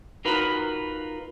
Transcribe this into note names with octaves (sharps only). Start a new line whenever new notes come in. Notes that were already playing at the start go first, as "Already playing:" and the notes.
D#4 F4 F#4 A#4 B4